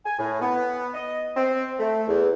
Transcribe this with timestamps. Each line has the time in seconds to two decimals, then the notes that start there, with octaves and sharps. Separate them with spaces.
0.05 G#5
0.18 A2
0.40 B3
0.94 D#5
1.35 C4
1.78 A3
2.08 E2